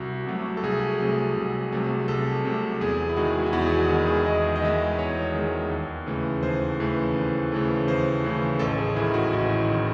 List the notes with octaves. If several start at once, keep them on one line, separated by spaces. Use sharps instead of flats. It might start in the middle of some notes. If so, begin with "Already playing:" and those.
Already playing: C2 F#4
C3 F#3 A3
A4
C2 G#4
C3 F#3 A3 G#4
C2
C3 F#3 A3
C2 A4
C3 F#3 A3
E2 G#4
E4
D#3 G#3 F#4
E4
E2 F#4
G#4
F#4
D#3 G#3 F#4
G#4
E2 D#5
D#5
D#3 G#3 E5
E2 C#5
D#3 G#3
D#2
C#3 E3 A3
D#2 C5
C#3 E3 A3
D#2
C#3 E3 A3
D#2 C5
C#3 E3 A3
A1 A4
G#4
G#2 D#3 E4
F#4
A1 E4
D#3